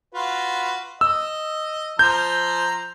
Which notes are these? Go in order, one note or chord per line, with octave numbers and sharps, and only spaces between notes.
F4 F#4 B4
D#5 E6
F3 C5 A#5 G6